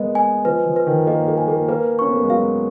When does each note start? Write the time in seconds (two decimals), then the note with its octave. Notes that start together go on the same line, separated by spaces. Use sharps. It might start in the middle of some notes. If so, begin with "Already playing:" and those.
Already playing: G#3 A#3 B3 B4 D#5
0.15 G#5
0.45 F3 B4
0.66 F3
0.76 B4
0.87 D#3
1.07 A#3 D#5
1.28 A#3
1.38 G#5
1.48 A#3
1.68 A#3 B4
1.99 C#4 C#6
2.08 B3
2.16 A#3
2.23 G#3
2.30 F#3 F5